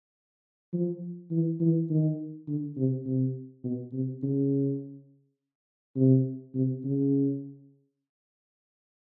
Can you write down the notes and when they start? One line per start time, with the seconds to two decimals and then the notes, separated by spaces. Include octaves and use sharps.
0.73 F3
1.31 E3
1.60 E3
1.90 D#3
2.47 D3
2.77 C3
3.06 C3
3.64 B2
3.93 C3
4.23 C#3
5.96 C3
6.55 C3
6.85 C#3